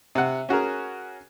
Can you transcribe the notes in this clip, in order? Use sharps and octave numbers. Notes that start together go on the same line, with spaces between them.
C3 F#5
C#4 F#4 G#4 A#4